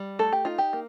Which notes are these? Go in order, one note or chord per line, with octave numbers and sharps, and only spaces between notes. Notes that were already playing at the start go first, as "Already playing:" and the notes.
Already playing: G3
A3 A4
G4
D#4 F4
G4
A#3